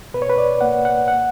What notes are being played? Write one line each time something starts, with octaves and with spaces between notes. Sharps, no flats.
B2 B4
C#5
B4
D5
A#3 F#5
F#5
F#5